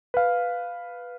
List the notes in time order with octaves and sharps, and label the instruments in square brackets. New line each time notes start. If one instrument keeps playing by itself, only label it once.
[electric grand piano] B4 F5